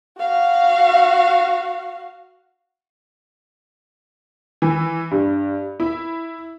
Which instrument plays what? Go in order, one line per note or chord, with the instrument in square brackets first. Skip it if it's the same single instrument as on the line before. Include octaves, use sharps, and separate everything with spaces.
[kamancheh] F#4 F5
[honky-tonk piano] E3
G2
E4